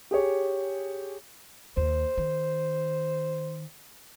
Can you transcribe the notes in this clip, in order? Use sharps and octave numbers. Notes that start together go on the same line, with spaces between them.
G4 G#4 C#5
D#2 C5
D#3